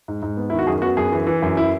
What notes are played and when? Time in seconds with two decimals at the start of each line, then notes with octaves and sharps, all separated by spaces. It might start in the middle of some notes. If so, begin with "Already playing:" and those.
0.08 G#2
0.22 G#2
0.37 B3
0.50 D#3 E4
0.59 F#4
0.67 F#2 G#4
0.82 B3 F#4
0.97 F#2 G#4
1.12 E3
1.27 E3
1.42 F#2
1.57 E4